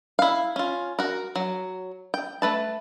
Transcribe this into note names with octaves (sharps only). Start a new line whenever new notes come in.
E4 F5
C#4 F4
F#4 A#4
F#3
G5
A3 B4 A5